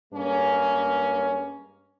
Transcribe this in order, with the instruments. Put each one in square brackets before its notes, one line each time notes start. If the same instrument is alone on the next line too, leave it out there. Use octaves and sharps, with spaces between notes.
[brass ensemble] G2 G#3 A#3 C#4